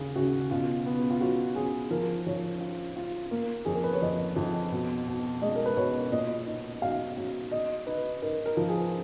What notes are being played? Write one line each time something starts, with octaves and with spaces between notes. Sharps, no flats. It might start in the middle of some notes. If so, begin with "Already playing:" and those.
Already playing: D#2 C#3 G#4
C#3 F#4
B2 F4
B3
F4
F#3 F#4
F#3 G#4
F3 A#4
F3 C#5
F4
F4
A#3
F2 G#4
A#4
B4
C#5
F2 D#5
F2
B2
B2
G#3 D#5
A#4
B4
B2 C#5
A#2 D#5
D#4
F#3 F5
F#3
D#4 D#5
D#4 B4
D#4 A#4
A#4
F3
G#4